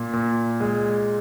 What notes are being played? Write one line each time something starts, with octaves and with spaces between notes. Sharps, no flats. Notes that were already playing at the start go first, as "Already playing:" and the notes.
Already playing: A#2
A#2
G#3